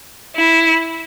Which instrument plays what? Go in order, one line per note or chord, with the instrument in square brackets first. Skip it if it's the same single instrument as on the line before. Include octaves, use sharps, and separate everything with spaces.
[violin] E4